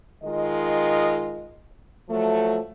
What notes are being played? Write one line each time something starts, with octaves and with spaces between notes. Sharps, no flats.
D#3 G#3 F4 D#5
F3 F#3 A3